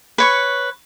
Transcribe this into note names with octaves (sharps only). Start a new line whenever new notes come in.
B4 C#5 C#6